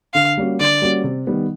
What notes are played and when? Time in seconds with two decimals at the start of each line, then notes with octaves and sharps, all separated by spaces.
0.14 D3 F5
0.37 G3 A#3 C#4 F#4
0.60 D3 D5
0.82 G3 A#3 C#4 F#4
1.04 C3
1.27 D#3 G3 B3